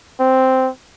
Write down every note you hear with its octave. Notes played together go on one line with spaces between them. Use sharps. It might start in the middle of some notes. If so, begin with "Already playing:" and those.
C4